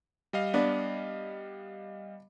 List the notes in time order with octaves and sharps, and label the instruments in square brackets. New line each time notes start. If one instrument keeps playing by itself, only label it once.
[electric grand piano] G3 D#5 F5
[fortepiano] B3 D4